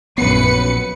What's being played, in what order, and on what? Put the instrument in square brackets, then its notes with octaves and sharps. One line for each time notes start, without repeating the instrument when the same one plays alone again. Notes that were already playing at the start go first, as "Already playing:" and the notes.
[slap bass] A#1 B3 [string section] F#2 B4 C#7